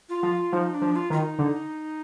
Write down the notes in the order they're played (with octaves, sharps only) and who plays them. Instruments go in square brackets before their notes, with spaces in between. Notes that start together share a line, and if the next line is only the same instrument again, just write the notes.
[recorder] F4
[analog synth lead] F3
[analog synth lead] F3 [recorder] D#4
[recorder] D4
[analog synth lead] F3
[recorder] F4
[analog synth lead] D#3 [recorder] F4
[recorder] D#4
[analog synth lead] D3